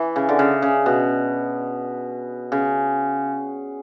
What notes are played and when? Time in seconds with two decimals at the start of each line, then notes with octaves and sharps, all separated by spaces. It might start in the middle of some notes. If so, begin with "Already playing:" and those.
Already playing: E3
0.16 C#3
0.29 D3
0.39 C#3
0.62 C#3
0.86 B2
2.52 C#3